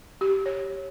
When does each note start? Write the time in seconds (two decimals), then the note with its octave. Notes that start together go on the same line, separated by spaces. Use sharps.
0.21 G4
0.46 C#5